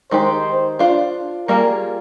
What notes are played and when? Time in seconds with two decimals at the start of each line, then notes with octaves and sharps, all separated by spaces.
0.11 D#3 G#3 D#4 G4 C5
0.79 D4 F4 C5
1.48 G3 A#3 F4 G#4 A#4